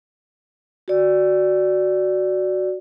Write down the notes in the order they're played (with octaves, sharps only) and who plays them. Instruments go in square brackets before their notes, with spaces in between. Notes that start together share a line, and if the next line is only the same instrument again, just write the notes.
[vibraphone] F#4 D5